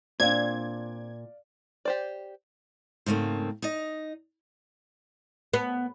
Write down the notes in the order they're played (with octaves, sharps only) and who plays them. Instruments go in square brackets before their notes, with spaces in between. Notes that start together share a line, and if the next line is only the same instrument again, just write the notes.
[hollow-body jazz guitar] A#2 [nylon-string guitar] C4 D4 [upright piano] D5 F5 [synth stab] G#6
[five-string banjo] G4 C5 D5
[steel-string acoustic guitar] G#2 C#3 A3 A#3 C4
D#4 D#5
[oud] B3